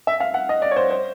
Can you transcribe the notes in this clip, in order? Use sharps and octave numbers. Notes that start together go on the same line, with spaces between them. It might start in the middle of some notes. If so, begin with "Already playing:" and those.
E5
F5
F#5
D#5
D5
C#5
C5
C5